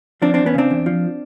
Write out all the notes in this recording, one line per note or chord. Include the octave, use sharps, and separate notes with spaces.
F3 C4 D4
E2 C4 D4
B3 C#4
C#3 C4 D4
E2
F3